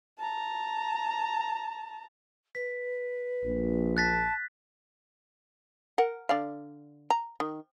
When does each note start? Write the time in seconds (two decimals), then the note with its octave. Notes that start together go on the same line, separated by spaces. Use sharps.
0.19 A5 A#5
2.55 B4 B6
3.45 A#1
3.97 A5 F#6 A6 B6
5.98 A#4 F#5
6.29 D3 D5 F5
7.10 A#5
7.40 D#3